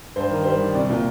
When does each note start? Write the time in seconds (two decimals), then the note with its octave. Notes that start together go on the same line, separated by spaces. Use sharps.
0.16 G2 C5
0.30 D#3 A#4
0.44 G3 C5
0.61 D#3
0.74 C2 D5
0.89 A#2 D5